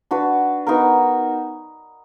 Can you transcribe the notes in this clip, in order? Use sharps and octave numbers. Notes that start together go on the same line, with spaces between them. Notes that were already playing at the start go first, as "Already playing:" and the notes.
D4 F#4 B4
B3 D#4 F#4 A#4